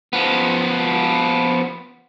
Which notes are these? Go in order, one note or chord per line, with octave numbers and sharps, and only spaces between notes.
F3 B3